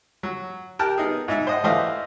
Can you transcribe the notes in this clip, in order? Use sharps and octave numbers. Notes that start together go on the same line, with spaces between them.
F#3
G4 A#4 G5 A5 F6 F#6
B3 D#4 G#4
G#2 D#4 E5
C5 D#5 F#5
E3 A3 C5 D5 D#5 F5